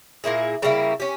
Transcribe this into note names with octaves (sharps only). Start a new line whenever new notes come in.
A#2 A#3 E4 G#4
C#3 G3 A#3 E4
C#4 G4